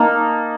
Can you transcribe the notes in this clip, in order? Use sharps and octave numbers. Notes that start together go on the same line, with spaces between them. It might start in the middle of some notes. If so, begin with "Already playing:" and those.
Already playing: A#3 D#4 A5